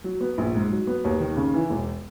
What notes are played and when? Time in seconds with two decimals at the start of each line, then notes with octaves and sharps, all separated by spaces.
0.04 F#3
0.21 B3
0.38 A#1
0.54 G#2
0.71 F#3
0.87 B3
1.04 D#2
1.20 D#3
1.37 C#3
1.54 E3
1.70 E1